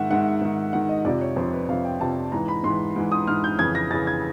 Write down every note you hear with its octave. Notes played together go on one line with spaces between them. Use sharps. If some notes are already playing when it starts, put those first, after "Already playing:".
Already playing: G#2 D#3 E5 F#5
G#2 D#3 F#5
G#2 D#3
G#2 D#3 F#5
D#5
F2 C3 F3 D5
C#5
F2 C3 F3 C5
B4
F2 C3 F3 F5
G5
F2 C3 F3 A5
G#2 E3 A#5
B5
G#2 E3 C6
G#2 E3
D#6
G#2 E3 F6
G6
F2 C#3 E3 G#6
A#6
F2 C#3 E3 A6
G#6